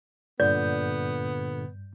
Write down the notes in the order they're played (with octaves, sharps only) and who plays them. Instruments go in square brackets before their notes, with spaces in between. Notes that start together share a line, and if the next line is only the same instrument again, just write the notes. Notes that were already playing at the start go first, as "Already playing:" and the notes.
[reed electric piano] G2 G6 [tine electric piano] A#2 D3 [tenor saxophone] B3 [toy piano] D5